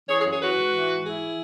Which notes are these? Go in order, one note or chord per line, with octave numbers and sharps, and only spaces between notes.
E3 G#4 C#5
G#4 C#5
F#2
G#4 C#5
E3 F#4 B4
G#2
E3
G#2
E3 E4 G#4